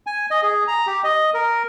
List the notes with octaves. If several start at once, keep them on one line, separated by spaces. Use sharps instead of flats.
G#5
D#5
G#4
A#5
G4
D#5
A#4